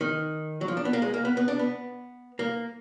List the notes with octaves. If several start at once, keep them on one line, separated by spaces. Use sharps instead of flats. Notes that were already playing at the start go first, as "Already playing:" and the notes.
D#3
F#3
F3
D4
B3
A#3
G#3
A#3
B3
B3
D4
B3
A#3